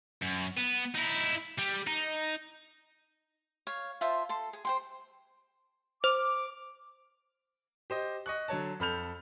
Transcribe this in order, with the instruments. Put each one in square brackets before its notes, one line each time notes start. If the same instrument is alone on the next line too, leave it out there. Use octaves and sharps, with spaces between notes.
[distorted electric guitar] F#2
B3
D#4 E4
G3
D#4
[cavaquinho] C#5 F5
F4 C5 E5 A5
A4 C6
G#4
C5 G5 C6
[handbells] C5 [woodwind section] D6
[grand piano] G4 C5 D#5
D#5 C#6 F#6
D3 F#3 C#5 A5
F2 A4 B5 F6 G6 F7